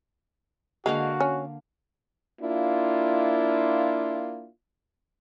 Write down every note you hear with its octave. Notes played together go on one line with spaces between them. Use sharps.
D3 G#3 A#3 F#4 F5
C#4
A#3 D4 E4 F4